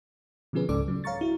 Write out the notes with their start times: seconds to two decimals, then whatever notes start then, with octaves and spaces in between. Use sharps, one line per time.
0.53 B2 D3 F3 C#4 G#4 B4
0.69 C#2 G#2 C#3 A4 D5 D6
0.88 C#3 F#3
1.04 C#5 F5 A#5 C#6 A6
1.21 E4 F#4